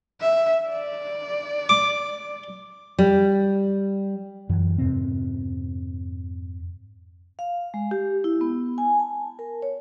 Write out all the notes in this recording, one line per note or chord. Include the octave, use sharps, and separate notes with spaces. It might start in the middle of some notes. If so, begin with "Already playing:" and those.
E5
D5
D6
G3
F#2 E3
F2 G#2 C3 C4
F5
G#3
G4
E4
B3
G#5
A5
A#4
C#5